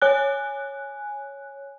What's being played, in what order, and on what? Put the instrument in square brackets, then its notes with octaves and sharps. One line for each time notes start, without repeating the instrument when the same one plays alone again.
[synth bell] C#5 G#5 F#6